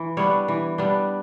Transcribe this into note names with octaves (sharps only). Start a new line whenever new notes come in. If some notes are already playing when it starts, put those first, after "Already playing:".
Already playing: E3
G3 B3 D4 C#5
E3
G3 B3 D4